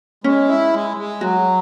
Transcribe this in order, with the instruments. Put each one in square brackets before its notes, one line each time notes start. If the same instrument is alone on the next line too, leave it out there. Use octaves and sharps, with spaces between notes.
[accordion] G#3 [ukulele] C#4
[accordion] E4
G#3
G#3
[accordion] F#3 [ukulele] F#4